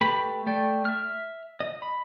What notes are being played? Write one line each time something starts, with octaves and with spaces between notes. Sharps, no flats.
A3 G4 B4 B5
A3 D5 G5
E5 F6
D#5
B5